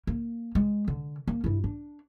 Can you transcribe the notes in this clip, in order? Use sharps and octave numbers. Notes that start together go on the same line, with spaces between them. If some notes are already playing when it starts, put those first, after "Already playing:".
A#3
G#3
D3
A#3
G2 E4
D4